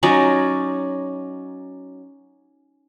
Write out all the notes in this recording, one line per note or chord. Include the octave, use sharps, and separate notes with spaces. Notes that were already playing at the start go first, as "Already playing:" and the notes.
F#3 C#4 D#4 D5